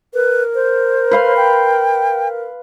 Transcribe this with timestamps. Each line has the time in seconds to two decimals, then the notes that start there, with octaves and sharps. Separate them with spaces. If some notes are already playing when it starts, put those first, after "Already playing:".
0.14 A#4 B4
0.55 C5
1.11 B4 F5 C6
1.37 G5